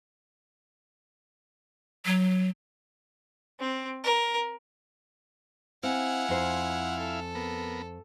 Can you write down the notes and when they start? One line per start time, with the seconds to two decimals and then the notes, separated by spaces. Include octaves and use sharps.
2.06 F#3
3.60 C4
4.04 A#4
5.83 C4 E4 F5 F#5 G#5
6.29 F2 C5
6.99 A4
7.35 B3 A#4